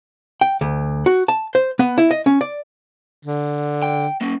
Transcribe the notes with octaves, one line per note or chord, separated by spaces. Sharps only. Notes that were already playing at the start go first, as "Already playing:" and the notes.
G5
D2
F#4
A5
C5
B3
E4
D#5
C#4
D5
D3
G5
A#3 C#4